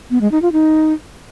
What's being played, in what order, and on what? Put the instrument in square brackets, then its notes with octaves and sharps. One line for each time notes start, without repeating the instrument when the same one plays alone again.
[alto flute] B3
G#3
D#4
F4
D#4